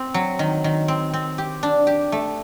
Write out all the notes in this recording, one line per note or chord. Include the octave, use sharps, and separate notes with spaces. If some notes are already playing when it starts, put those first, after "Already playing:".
Already playing: C4
F#3
D#3
D#3
C4
C4
G4
D4
G4
A3